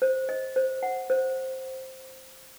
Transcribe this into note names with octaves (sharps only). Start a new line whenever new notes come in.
C5
D#5
C5
F#5
C5